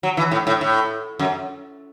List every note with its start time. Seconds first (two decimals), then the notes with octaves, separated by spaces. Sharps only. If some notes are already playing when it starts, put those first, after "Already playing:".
0.03 F#3
0.17 E3
0.31 A2
0.47 A2
0.61 A2
1.19 F#2